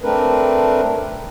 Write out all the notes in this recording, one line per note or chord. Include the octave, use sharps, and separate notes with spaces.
A3 C4 D4 A#4 B4